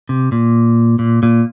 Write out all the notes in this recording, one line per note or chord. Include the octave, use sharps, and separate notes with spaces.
C3
A#2
A#2
A#2